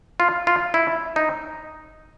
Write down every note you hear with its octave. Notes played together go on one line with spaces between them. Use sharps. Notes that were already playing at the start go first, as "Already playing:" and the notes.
F4
F4
E4
D#4